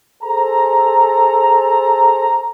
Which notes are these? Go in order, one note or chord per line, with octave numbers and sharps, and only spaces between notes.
G#4 A4 C5 A#5